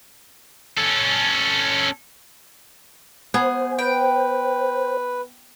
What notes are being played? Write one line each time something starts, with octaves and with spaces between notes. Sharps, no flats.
C#4 A4
B3 G#4 C5
B4 G5